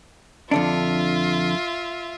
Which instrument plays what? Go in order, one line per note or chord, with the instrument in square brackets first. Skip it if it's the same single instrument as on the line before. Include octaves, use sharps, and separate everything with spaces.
[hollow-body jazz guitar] F2 D3 D4 [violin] F4 E5